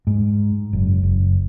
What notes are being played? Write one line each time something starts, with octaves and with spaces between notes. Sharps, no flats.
G#2
F#1
F#1